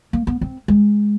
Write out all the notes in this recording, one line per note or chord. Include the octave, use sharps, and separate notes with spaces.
A#3
B3
C4
G#3